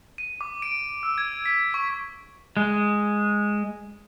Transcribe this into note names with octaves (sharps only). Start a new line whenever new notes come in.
D#7
D6
D7
E6
G#6
B6
C#6
G#3